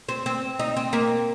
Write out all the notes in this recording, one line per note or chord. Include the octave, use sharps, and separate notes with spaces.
C4
C4
D#4
C4
A#3